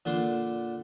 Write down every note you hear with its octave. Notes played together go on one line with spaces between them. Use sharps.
A#2 D3 D4 C6 D6